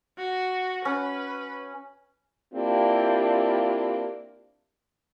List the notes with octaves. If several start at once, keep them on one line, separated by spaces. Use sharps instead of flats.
F#4
C#4 B4
A#3 C4 D4 E4 F4 G4